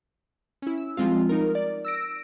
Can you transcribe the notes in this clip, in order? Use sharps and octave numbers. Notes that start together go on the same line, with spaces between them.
C#4 E4
E6
F3 G3 G#3 C4 F4
D#4 A#4
D5
E6 A#6 D7